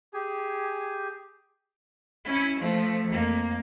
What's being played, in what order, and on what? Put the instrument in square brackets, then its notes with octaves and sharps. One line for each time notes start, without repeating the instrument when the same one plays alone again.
[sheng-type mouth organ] G4 G#4 G#5
[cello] C#4 E4
F3 A3
F2 A#3